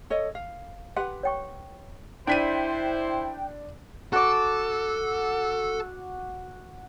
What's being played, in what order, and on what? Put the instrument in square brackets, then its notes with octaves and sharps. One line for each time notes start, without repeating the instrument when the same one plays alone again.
[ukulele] A4 C#5 D#5
F5
[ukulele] G4 B4 F#5 [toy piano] C6
[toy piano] C#5 G5 C#6
[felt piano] D4 B6 D#7 [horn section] E4 C5 [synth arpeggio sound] G5
[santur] F#4 D6 [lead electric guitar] A4